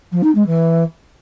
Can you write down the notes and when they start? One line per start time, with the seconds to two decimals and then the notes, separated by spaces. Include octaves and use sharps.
0.11 F3
0.23 D#4
0.35 G#3
0.46 E3